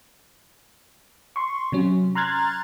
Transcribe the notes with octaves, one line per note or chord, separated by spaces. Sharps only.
C6 C#6
C3 F#3 C#4
A#5 C6 F6 F#6 G#6 A6